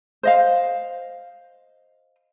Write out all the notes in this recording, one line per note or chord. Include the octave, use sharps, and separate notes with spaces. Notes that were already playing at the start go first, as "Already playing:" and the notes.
C5 D#5 F5